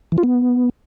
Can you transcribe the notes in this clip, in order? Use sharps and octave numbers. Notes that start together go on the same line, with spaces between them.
E3
F4
B3